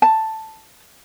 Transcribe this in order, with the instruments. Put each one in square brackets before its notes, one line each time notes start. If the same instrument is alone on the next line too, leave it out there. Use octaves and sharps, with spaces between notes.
[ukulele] A5